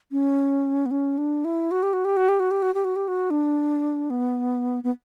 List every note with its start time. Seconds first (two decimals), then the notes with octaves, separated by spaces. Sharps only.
0.12 C#4
0.86 B3
0.91 C#4
1.18 D4
1.45 E4
1.71 F#4
1.83 G4
1.93 F#4
2.05 G4
2.17 F#4
2.29 G4
2.40 F#4
2.51 G4
2.62 F#4
2.74 G4
2.84 F#4
2.96 G4
3.08 F#4
3.30 D4
4.10 B3
4.84 B3